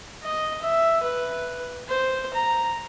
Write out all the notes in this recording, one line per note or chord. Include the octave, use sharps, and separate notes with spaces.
D#5
E5
B4
C5
A#5